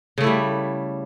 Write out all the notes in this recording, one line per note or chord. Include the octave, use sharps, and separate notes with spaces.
C#3 G3 A3 E4